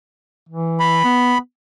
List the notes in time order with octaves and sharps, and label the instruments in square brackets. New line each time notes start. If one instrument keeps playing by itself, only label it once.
[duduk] E3
[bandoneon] B5
[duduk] B3